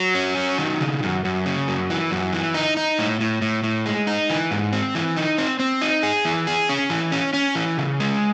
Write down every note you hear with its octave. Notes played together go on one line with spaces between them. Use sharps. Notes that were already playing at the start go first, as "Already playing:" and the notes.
Already playing: F#3
C#4
F#3
D#3
C#3
F#2
F#2
C#3
F#2
E3
F#2
E3
D#4
D#4
A2
A2
A2
A2
G#3
D#4
E3
G#2
C4
E3
D#4
C4
C4
D#4
G#4
E3
G#4
C#4
E3
C#4
C#4
E3
C#3
G#3